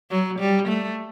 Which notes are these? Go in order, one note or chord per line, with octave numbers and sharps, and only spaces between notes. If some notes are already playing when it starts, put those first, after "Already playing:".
F#3
G3
A3